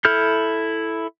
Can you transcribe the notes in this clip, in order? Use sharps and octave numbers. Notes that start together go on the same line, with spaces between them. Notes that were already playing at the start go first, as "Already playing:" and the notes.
E4 A4 F6 G6